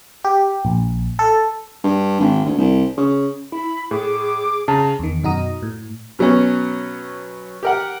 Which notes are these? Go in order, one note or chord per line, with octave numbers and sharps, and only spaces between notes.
G4
A#1
A4
G2
G#1
D2
C2
C#3
E4 B5
A2 G#4 D6
C#3 A5 A#5
E2 D#3
F#2 B2 D#4 F#4 A#5 D#6
A2
B2 F#3 B3 C#4
G4 A#4 F#5